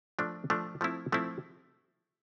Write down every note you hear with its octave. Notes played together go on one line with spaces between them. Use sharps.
F3 A3 D4
F3 A3 D4
F3 A3 C4 E4
F3 A3 C4 E4